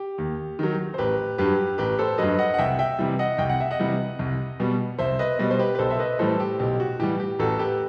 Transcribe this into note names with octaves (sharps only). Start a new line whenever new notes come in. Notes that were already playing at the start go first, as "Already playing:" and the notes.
Already playing: G4
D#2
D#3 F#3
C5
A1 G4 B4
G2 F#3 G4 B4
A1 G4 B4
A4 C5
G2 F#3 B4 D#5
D#5 F#5
F#5
C2 E5 G5
E5 G5
C3 E3 G3
D#5 F#5
C2 G5
F#5
E5
D#5 F#5
C3 E3 G3
C2
B2 G3
C2 C5 E5
B4 D#5
B2 G3 B4 D#5
C5
G4 B4
B4
B1 A4 C5
E5
B4 D#5
A2 E3 G3 A4 C5
G4
B1 G4
F#4
A2 E3 G3 G4
G4
A1 F#4 A4
G4 B4